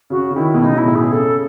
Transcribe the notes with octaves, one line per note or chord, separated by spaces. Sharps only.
C#3 F#4
C#3
D#3 E4
B2
C#3 D#4
B2 E4
A2
B2 G#4
C#3 A4